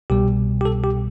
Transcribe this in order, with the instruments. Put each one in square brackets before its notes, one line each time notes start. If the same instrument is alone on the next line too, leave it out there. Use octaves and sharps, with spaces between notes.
[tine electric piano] C2 B2 G3 G4
G4
A4
G4